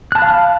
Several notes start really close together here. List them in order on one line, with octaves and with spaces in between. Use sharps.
F#6 A5 B5 F5 F6